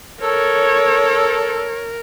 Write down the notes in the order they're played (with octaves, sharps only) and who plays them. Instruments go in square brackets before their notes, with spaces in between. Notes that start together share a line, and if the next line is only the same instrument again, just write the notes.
[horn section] A4 [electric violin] A#4 [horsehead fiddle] C#5